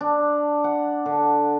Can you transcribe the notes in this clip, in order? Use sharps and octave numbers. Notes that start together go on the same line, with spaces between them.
D4
F#5
D3